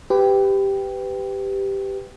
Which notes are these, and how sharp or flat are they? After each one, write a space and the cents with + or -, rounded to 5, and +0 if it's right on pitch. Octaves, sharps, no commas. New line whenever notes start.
G4 +0 B4 +25